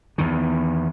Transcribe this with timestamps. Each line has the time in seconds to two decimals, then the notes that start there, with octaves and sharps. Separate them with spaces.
0.18 E2 D#3